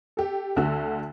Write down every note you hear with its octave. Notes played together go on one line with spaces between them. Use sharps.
G4 A4
D2 D3 F#4 E6